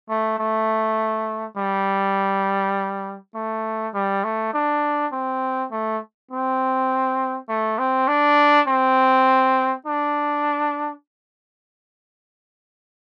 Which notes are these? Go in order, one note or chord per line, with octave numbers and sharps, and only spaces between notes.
A3
A3
G3
A3
G3
A3
D4
C4
A3
C4
A3
C4
D4
C4
D4